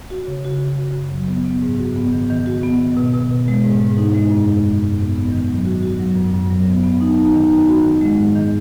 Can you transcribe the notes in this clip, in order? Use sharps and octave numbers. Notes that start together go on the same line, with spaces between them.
F#4
C#3
F#4
F#4
F#4
F#2
F#3
B3
B3
G#2
F#4
B3
D#3
D#3
F#4
B3
D#3
B2
B2
B2
G#3
G#2
G#2
D#4
G#3
F#2
G#3
F#2
F#2
B3
B3
D#3
F#3
F#4
F#4
F#3
F#2
F#2
F#3
B3
B3
D#4
D#4
D#3
D#4
F#4
D#3
G#3
G#2
D#3